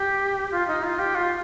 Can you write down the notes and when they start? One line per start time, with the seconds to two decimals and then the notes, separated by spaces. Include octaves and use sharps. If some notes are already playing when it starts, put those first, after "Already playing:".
Already playing: G4
0.51 F4
0.67 D#4
0.83 F4
0.99 G4
1.15 F4